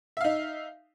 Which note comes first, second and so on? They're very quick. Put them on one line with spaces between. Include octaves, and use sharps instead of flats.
E5 F5 D#4